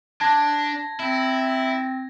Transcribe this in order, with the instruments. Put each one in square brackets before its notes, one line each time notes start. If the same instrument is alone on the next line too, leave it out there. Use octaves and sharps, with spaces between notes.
[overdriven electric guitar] D4 [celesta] A5 [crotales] G#6 A#6
[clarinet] C4 [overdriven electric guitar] E4